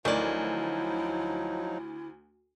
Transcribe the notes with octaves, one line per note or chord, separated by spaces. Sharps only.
D2 D#3 F3 F#3 D#4 E4 D5